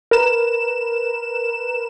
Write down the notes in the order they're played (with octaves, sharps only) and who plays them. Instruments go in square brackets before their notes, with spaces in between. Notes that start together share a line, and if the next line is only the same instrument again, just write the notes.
[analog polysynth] A#4 B4 E7